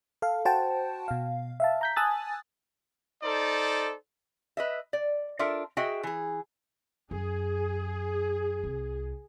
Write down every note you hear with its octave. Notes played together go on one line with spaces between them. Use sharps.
A4 F5
F#4 C5 F#5 G5 A5
B2 F5
E5 F5 A5
A#5 G6 B6
G#5 A5 D#6 E6 F#6 A6
D#4 A4 C5 D5
B4 D#5 E5
D5
D4 F4 A4 A#4 E5
F#4 G#4 D#5 E5 G5
E3 G#4
F#2 G#4
C2 F4